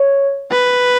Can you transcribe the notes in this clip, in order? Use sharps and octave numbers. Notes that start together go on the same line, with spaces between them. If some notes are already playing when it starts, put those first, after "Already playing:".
Already playing: C#5
B4